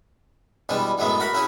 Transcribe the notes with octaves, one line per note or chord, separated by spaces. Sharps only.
B2 E3 G3 G#3 D4
F#2 A2 F#3 G#3 A3 B3
F#4 A#4 F#5 B5
C#4 E4 F#4 G#4